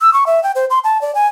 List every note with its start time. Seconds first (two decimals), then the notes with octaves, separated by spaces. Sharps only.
0.01 E6
0.13 C#6
0.27 E5
0.43 G5
0.55 C5
0.70 C6
0.84 A5
1.01 D5
1.15 G#5